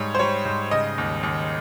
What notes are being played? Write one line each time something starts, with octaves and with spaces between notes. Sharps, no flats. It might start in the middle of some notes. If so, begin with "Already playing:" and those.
Already playing: G#2 G3 C#5
C5
G3 C#5
G#2
C#3 D#5
D#2
D#2